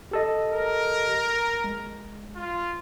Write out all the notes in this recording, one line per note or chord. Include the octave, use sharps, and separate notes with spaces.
G4 A4 D#5
A#4
G#3
F4